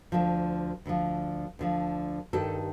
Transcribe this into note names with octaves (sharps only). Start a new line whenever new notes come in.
D2 D3 F3
D2 D3 F3
D2 D3 F3
G2 D#3 G4 A4